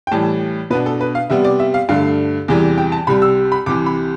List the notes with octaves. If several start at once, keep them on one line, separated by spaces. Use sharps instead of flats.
G5
A2 E3 G3 A5
B2 B3 D4 B4
A4
B4
F5
C3 G3 B3 E5
D5
E5
F5
G2 D3 A3 F5
E2 C3 E3 G3
G5
A5
C2 C3 G3 B5
E6
B5
C2 C3 E3 D6
B5